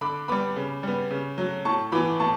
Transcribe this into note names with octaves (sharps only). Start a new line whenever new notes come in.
D3 B5 D6
G3 B3 B5 D6
C#3
G3 B3
C#3
F#3 A3
A2 A5 C#6
E3 B3 B5 D6
A2 A5 C#6